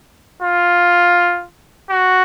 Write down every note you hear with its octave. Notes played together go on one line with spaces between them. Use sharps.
F4
F#4